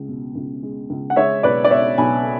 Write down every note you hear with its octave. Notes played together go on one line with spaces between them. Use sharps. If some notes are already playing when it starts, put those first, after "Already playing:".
Already playing: C#2 G#3
B2
C#2
G#3
C#2
F#5
G#3 C#5 E5
B1 B4 D5
D5
B2 C#5 E5
B1 G#5 B5